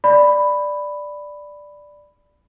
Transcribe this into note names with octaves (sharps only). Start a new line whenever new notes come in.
D5 B5